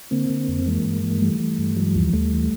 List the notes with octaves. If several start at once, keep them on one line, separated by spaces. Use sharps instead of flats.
D3 A#3 C4
D3
F2
E3 G#3 A#3
G2
E3
E3 G3 A3
E3
G2
E3 F#3 G#3
D#2 F3 G3
D#2 G3 A3
E3